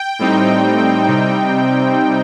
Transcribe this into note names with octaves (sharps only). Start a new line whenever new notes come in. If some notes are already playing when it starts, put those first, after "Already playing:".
Already playing: G5
A2 G3 C4 D#4
C3 G3 C4 D#4